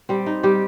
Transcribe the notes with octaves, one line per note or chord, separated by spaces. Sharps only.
G3 C4
D#4
G3 G4